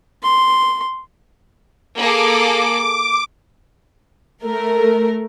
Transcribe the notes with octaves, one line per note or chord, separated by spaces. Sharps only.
C6
A#3 G#4 A4 D6
A3 A#4